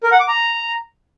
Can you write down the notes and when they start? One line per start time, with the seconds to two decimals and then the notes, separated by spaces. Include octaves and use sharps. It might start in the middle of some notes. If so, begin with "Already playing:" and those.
0.03 A#4
0.12 F#5
0.20 D6
0.28 A#5